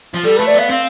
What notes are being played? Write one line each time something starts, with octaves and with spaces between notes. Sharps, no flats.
F3
G3 A4
A3 B4
D5
B3 F5
C4 F5